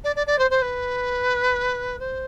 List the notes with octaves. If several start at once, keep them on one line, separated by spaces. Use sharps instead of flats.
D5
D5
D5
C5
C5
B4
C5